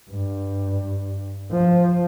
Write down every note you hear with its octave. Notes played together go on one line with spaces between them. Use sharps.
G2
F3